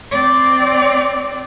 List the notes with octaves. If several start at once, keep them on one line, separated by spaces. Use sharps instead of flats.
C4 D5